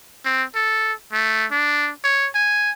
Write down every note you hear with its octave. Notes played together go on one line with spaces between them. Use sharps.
C4
A4
A3
D4
C#5
G#5